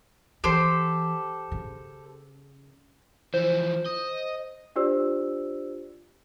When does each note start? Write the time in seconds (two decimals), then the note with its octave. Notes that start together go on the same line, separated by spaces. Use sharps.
0.44 E3 G4 A4 C5
1.51 C#3
3.34 E3 F3 C5
3.86 D#5
4.76 D4 F4 G4 C5 D5 E6